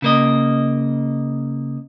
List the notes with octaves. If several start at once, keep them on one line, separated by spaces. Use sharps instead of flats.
C#3 A#3 D#5